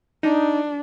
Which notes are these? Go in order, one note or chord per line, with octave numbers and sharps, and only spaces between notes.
D4 D#4